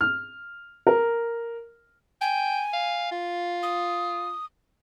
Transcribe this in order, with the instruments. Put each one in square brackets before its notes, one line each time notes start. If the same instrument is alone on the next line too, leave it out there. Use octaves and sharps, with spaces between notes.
[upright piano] F6
A#4
[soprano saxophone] G5 [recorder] G#5
[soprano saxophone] F5
F4
[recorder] D#6